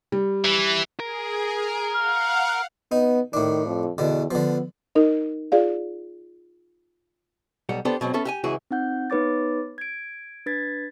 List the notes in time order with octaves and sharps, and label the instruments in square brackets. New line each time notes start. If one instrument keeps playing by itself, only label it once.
[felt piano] G3
[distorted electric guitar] E3
[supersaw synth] G#4 [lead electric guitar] A#4
[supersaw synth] F5 F#5 [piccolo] F6
[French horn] B3 [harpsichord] D#4
[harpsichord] A2 D4 [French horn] D#3
[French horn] F2
[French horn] E2 [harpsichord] B2 D3
[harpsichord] D3 F3 [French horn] B3
[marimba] D#4 A#4 D#5
F4 G#4 D5 F5
[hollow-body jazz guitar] B1 G3 F#5
B3 D4 G4 A4 C5
B2 F#3 G#3 C4
B3 C#4 A4 E5
G4 E5 G#5
C#2 E3 F#4 G#4
[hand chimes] C4 D#4 F#5 G6
B3 D#4 B4 C#5 D6 A6
G#6 D7
D4 B4 G#6 A6 B6